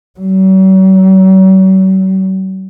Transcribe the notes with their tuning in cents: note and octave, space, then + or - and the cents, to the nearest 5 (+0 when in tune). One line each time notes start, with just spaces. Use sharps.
F#3 +45